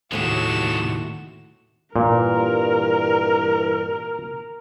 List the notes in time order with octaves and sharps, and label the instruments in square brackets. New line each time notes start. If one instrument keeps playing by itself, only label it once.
[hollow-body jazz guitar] D#2 A2 A3 [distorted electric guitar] C3 G#3 [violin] F#4 E7
[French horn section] G2 E3 [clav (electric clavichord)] A#2 [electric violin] A#4